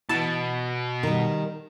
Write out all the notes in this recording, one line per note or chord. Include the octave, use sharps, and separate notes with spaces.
B2 E3 A5
D#3 G3